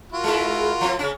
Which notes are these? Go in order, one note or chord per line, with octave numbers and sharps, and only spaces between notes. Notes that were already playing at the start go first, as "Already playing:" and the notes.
F4 F#4 A#4
G#3 E4
F3 C4
C#3 C#4